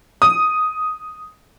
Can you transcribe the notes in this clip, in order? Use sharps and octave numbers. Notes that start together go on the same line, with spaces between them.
D#6